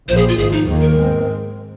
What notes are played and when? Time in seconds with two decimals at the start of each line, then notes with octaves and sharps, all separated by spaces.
0.09 A#1 A#2 F3 C5
0.18 G#4
0.28 F4
0.37 G#1 G#2 F3 G#4
0.52 D#4
0.67 D#2 D#3 A#3
0.82 A#4
0.96 G#2 G#3 C4